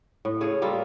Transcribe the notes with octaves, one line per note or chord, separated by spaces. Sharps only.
A2
C#3 A3 G#4 C#5
G3 A#3 F4 A4